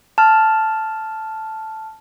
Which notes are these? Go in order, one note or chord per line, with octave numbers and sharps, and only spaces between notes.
A5 F6